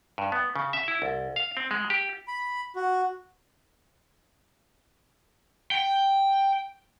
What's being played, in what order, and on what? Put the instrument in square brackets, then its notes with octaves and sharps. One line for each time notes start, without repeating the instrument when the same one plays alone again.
[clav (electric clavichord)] G2
B3
C#3
E5
E4
C2
F5
C4
G#3
G4
[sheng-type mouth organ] B5
F#4
[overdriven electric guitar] G5